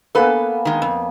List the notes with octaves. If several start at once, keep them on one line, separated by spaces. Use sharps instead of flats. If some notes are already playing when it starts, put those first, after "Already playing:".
A#3 B3 A4 B4 G#5
D#3 G#3
F2